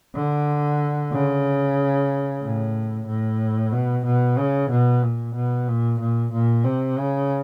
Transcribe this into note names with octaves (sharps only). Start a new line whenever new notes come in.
D3
C#3
A2
A2
B2
B2
C#3
B2
A#2
B2
A#2
A#2
A#2
C3
C#3